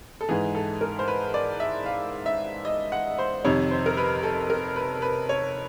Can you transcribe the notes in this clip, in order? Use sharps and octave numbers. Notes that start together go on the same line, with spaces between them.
A4
G#2 E3 G#4
A4
A#4
C5
B4
D5
E5
F5
E5
D#5
F#5
C5
F2 C3 D#3 C#5
C5
A#4
B4
A4
A#4
B4
B4
C#5